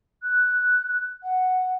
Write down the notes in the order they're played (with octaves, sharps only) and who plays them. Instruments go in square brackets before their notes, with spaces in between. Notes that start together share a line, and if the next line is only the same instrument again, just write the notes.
[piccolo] F#6
F#5